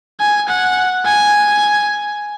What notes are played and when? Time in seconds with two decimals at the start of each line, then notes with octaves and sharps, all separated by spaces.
0.20 G#5
0.48 F#5
1.05 G#5